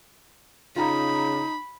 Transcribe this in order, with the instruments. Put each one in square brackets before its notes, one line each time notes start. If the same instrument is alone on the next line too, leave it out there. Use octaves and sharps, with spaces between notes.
[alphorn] C#3 [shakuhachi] D#4 [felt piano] F4 A#5 [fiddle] B5